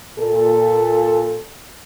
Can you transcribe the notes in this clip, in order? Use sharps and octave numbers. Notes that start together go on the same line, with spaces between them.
A#2 A4